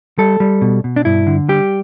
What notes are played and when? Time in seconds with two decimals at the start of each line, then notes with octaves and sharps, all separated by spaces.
0.18 G3 A4
0.40 G3
0.61 B2
0.84 B2
0.96 D4
1.05 G2 E4
1.27 D3
1.49 G3 G4